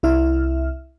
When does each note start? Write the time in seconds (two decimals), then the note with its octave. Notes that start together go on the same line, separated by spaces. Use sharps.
0.03 C2 E4 E5 F6